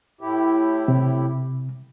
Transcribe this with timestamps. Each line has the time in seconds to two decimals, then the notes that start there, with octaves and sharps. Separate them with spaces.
0.21 A2 E4 G4
0.88 C3